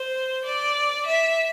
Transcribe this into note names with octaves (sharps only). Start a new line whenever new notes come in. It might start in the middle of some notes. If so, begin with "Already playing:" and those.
Already playing: C5
D5
E5